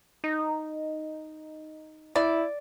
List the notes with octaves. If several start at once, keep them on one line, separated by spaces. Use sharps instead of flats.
D#4
E4 D5